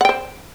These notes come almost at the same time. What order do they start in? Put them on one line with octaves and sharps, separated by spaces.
F#5 G5 C5